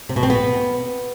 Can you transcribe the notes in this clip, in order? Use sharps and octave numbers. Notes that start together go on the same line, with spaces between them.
C3
B2
C4
B3